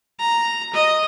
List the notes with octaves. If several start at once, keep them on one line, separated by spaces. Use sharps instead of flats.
A#5
D#5